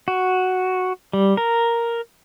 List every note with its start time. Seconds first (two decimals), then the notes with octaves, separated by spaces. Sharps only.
0.08 F#4
1.13 G3
1.37 A#4